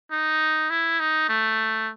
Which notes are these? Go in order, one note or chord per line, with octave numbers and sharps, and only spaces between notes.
D#4
E4
D#4
A3